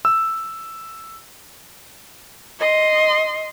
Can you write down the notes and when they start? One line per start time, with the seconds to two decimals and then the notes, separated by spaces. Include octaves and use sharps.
0.05 E6
2.60 D#5 C6